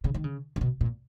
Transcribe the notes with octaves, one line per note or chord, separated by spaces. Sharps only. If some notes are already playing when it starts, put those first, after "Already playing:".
C#3
D#3
C#3
C#3
B2
A#2